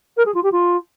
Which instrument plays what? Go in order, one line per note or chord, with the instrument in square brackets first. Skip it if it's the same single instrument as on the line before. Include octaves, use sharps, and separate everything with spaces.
[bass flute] A#4
G#4
F4
G4
F4